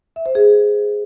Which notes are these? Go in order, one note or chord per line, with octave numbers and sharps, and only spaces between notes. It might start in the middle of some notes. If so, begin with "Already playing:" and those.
E5
C5
G#4